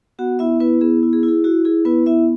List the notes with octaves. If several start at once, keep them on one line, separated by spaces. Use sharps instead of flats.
B3 F#4 F#5
B3 E4 E5
B3 E4 B4
B3 G#4
E4
G#4
E4
G#4
E4 F#4
E4 G#4
B3 E4 B4
B3 E4 E5